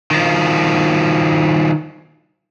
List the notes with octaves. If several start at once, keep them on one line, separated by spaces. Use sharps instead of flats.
D#3 F3